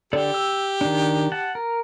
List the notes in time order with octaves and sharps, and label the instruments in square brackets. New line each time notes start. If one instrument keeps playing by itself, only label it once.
[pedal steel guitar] D3 A4 D5 [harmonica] G4
[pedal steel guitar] E6
D#3 D4
F#5 A5
A#4